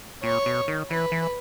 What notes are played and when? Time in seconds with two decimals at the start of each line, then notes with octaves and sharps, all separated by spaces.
0.23 A#2 C#5
0.46 B2
0.68 D#3
0.90 E3 B4
1.12 E3